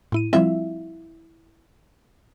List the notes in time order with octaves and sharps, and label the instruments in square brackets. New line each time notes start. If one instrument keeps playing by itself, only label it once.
[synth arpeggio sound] A2 E4 D#7
[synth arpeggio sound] F3 G3 C4 [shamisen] E4 F4 E5